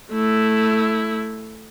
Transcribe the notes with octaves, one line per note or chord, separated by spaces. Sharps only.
A3 E4